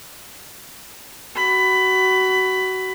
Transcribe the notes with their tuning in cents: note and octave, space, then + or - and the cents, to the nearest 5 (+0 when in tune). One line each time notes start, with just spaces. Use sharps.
F#4 +25 B5 +15